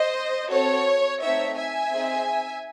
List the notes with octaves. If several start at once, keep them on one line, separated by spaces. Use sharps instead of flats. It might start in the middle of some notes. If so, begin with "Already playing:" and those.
Already playing: C5 D#5
C4 F#4 A4 C#5
A3 C4 D#4 C#5 E5
E5 G#5
C4 D#4 G#4